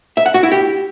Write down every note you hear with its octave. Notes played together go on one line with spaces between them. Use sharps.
E5
F#5
F#4
E4
G4